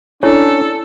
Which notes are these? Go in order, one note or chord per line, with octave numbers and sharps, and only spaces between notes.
C#4 D4 E4 A4 C#5